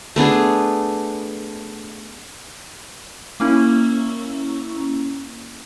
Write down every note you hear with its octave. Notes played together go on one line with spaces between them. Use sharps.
A3 B3 D4 G#4
A#3 C#4 E4